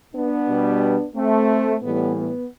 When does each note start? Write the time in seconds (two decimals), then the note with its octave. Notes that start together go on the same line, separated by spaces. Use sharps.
0.15 B3 D4
0.48 B2 G3
1.16 A3 C4
1.82 A2 E3 G3 B3
2.16 B3